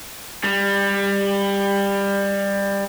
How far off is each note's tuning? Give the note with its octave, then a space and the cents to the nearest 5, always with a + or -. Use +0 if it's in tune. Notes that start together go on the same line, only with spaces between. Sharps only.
G3 +20